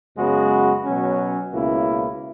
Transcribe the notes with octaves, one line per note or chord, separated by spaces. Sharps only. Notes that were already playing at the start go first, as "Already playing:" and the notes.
F#2 C#3 G#3 B3 F#4
B2 F#3 C#4
C#2 B2 A#3 E4